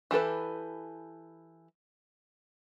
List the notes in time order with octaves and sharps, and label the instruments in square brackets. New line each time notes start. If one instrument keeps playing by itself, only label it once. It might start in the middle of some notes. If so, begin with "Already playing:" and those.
[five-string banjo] E3 G4 A4 B4